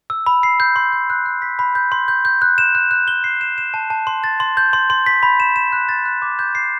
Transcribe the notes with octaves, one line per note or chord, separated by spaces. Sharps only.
E6
B5
C7
G6
C6
G6
F#6
F#6
B6
B5
G6
C6
G6
G6
F#6
E7
F#6
F#6
G7
C7
E7
E7
A5
A5
C6
A6
C6
G6
C6
C6
B6
B5
E7
E7
F#6
A6
F#6
D6
G6
C7